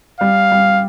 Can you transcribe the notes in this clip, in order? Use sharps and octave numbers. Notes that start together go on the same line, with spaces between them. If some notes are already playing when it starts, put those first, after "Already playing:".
G3 F5
G3